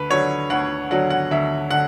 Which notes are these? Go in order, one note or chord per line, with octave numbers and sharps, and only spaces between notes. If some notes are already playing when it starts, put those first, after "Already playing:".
Already playing: D2 B4
D3 F#3 C#5
D2 F#5
D3 F#3 F#5
F#5
D2 E5
D3 F#5